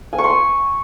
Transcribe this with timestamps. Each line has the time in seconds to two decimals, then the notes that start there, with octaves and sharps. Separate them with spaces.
0.13 G#5
0.18 C#6
0.24 C6
0.30 C#6